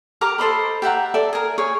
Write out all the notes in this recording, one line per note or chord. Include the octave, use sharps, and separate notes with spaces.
G4 A#4 A#5 D6
A4 C5 D#5 B5
G4 E5 F#5 A#5
A4 D5 E5
G#4 A#4
G#4 C#5 C#6